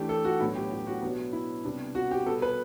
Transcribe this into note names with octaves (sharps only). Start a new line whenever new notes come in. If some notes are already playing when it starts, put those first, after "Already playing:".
Already playing: E3 A3 D4 G4
A4
F#4
A2 F#3 B3 D4 E4
G4
G4
F#4
B2 F#3 B3 D4
E4
C3 G3 B3 D4
F#4
G4
B2 G3 B3 A4
B4